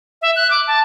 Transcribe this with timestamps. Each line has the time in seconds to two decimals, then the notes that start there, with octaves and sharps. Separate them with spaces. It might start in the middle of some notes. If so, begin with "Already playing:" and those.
0.22 E5
0.36 F#6
0.51 D6
0.67 A5